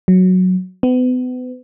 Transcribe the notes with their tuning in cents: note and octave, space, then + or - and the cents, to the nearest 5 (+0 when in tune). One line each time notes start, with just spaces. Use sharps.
F#3 -5
B3 +35